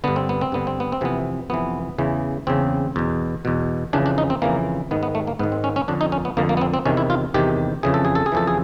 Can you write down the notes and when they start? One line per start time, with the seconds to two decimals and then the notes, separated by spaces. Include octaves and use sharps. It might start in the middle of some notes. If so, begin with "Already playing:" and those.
0.04 G2 D3 B3
0.16 C4
0.29 B3
0.41 C4
0.52 G2 D3 B3
0.67 C4
0.80 B3
0.92 C4
1.01 F2 C3 E3 B3
1.50 F2 C3 E3 B3
1.98 E2 C#3 E3
2.47 E2 C#3 E3 C4
2.96 E2 B2
3.45 E2 B2
3.93 F2 C#3 E3 D4
4.06 D4
4.18 D#4
4.30 C4
4.42 F2 C#3 E3 A#3
4.91 G#2 D#3 B3
5.03 B3
5.15 A3
5.27 A#3
5.39 G#2 B3
5.44 D#3
5.52 C4
5.64 C#4
5.76 C#4
5.88 F2 D3 D4
6.01 D#4
6.12 C#4
6.25 B3
6.37 F2 D3 A#3
6.49 A#3
6.57 B3
6.61 C4
6.74 C4
6.86 E2 C3 D#3 C#4
6.97 E4
7.10 F4
7.34 E2 C3 D#3 G4
7.83 F2 C#3 E3 G#4
7.94 A4
8.05 G#4
8.15 A4
8.26 G#4
8.32 F2 C#3 E3 A4
8.47 G#4